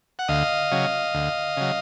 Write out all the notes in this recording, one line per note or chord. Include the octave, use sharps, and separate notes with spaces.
F#5
D2 D#5 F5
C#3 F#3
D2
C#3 F#3